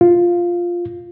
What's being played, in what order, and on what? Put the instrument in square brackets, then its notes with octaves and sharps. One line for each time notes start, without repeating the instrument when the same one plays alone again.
[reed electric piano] F4